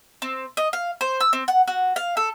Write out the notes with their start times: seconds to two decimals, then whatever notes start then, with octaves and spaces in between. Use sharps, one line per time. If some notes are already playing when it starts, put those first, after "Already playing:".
0.22 C4
0.57 D#5
0.73 F5
1.01 C5
1.20 E6
1.33 C4
1.48 F#5
1.68 F#4
1.96 F5
2.17 A4